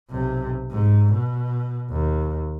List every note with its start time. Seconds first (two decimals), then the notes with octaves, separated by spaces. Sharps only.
0.11 B1 C3
0.71 G#2
1.13 B2
1.90 D#2